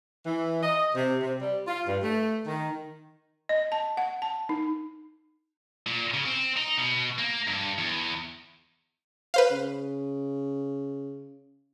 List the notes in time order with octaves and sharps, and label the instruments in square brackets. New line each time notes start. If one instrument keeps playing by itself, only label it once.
[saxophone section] E3
D#5
C3
C3
G3
F4
G2
A3
D#3
[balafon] D#5
A5
F#5
A5
D#4
[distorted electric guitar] A#2
C#3
C4
D#4
B2
A#3
G2
E2
[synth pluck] B4 C5 F5
[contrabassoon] C#3